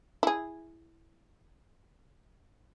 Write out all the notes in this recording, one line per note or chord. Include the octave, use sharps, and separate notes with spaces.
E4 G#4